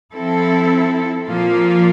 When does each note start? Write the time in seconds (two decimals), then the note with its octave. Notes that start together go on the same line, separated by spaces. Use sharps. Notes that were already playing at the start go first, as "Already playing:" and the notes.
0.13 F3 C4 E4 A4
1.27 A#2 F3 A#3 F4